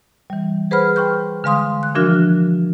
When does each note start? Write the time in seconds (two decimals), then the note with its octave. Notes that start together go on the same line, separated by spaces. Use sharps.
0.30 E3 G3
0.71 G#4 B4 C5 F#5 B5 F6
0.96 G5 C6 C#6 F6 G6
1.44 D3 G#3 F5 C6 D#6
1.83 F#6
1.95 E3 F3 D4 F#4 A#4 F6